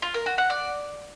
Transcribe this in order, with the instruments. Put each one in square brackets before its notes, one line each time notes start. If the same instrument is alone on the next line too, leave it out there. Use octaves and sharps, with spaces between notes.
[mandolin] F4
A#4
F#4
F#5
D5